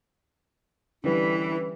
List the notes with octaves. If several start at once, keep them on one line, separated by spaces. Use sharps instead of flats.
D3 E3 G3 C#4 E4 B4